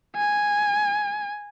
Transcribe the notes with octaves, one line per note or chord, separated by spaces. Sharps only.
G#5